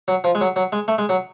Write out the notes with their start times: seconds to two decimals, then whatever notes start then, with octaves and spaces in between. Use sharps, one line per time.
0.08 F#3
0.24 F3
0.35 G#3
0.41 F#3
0.56 F#3
0.72 G#3
0.88 A3
0.98 G#3
1.09 F#3